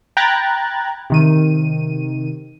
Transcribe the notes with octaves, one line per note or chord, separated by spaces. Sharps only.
G5 A#5 B5 F#6 G#6 A6
C3 D#3 D#7